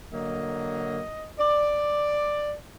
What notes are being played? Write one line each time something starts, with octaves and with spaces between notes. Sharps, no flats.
D3 F#3 A#3 D#5
D5